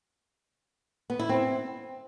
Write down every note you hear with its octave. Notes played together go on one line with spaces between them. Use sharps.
B3
E4
C4